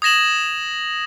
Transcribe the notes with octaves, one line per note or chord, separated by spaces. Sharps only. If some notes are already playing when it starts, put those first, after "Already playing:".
D#6 G#6 A#6 E7 F#7